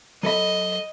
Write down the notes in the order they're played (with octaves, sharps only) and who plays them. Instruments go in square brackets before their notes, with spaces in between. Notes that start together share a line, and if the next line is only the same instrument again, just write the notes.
[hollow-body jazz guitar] F#3 A4 B5 [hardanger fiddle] D#5